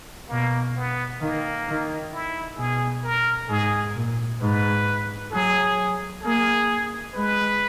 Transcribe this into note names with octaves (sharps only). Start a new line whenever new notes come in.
B2 A#3
B3
D#3 A#3
D#3
E4
B2 G#4
A#4
G#2 G#4
A#2
G#2 B4
F#3 G#4
A#3 G#4
G#3 B4